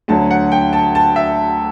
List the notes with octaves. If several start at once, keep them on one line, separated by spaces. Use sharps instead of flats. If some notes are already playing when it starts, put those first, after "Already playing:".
D2 D3 F#3 A5
F#5
G5
A5
A5
E5